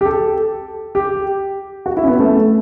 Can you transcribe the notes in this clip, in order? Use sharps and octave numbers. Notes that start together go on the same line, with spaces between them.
G4
A4
G4
F#4
E4
C#4
B3
A3